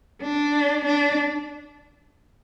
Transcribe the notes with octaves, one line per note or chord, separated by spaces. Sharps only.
D4
D4